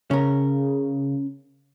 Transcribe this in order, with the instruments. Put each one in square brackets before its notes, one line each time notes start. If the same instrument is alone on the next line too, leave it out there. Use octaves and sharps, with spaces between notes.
[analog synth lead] C#3 [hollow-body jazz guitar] C#4 A#4